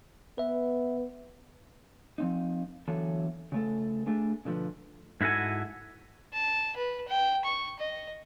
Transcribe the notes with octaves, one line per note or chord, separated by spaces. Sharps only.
B3 B4 E5
F3 C4 D#4
D3 E3 F#3 B3 A4
C#3 A3 A4
A3 D4 G#4
B2 D3 F3 B3
G#2 E4 F#4 A4 G#5
A5
B4
G5
C#6
D#5